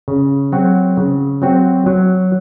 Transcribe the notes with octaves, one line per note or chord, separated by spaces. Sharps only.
C#3
F#3 C4 F#4
C#3
F#3 C4 F#4
F#3